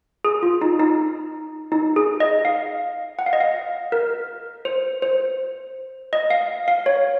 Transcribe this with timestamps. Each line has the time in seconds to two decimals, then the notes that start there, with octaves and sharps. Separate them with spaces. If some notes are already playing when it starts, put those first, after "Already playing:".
0.25 G#4
0.43 F4
0.62 D#4
0.80 D#4
1.72 D#4
1.96 G#4
2.20 D#5
2.45 F5
3.19 F#5
3.26 F5
3.33 D#5
3.40 F5
3.92 A#4
4.65 C5
5.02 C5
6.13 D#5
6.30 F5
6.68 F5
6.86 C#5